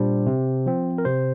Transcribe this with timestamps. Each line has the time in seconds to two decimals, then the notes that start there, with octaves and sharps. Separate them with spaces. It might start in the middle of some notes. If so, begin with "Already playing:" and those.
Already playing: A#2 G3 D4 C5
0.26 C3
0.66 F3 C4
0.98 A#4
1.05 C3 C5